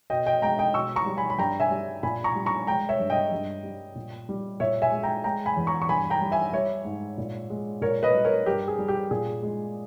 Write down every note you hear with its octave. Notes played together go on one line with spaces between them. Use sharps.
B2 D#5 G5
D#5 G5
G#3 G5 A#5
D#5 G5
B2 C#6 E6
A#5 C#6
G3
G#5 B5
B5
G2 G5 A#5
E5 G#5
G3
A#2 G#5 B5
A#5 C#6
G3
A#5 C#6
G#3 G5 A#5
C#5 E5
G2
D#5 G5
G2
G3
A#2
G3
A#2 C#5 E5
E5 G#5
G#3
G5 A#5
G#3 G5 A#5
G#5 B5
E2
A#5 C#6
C#6
G2 G#5 B5
G5 A#5
G3
E5 G#5
G3 C#5 E5
G#2
A#2
G#3
A#2 A#4 C#5
B4 D#5
G3
A#4 C#5
G2 G4 A#4
G#4
G3
G4
A#2 G#4
G#3